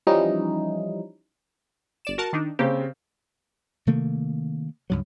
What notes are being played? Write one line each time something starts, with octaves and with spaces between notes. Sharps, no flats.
E3 F3 G3 C#4 D#4 E4
G1 D5 E7
F#4 A#4 A5
D#3 D4 D#4
C#3 A#3 C4 G4
C3 D#3 A3 A#3
C#2 G2 F#3